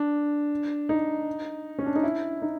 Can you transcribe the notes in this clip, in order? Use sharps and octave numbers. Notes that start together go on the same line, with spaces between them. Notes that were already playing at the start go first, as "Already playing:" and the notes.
Already playing: D4
D#4
C#4
D4
D#4
E4
D#4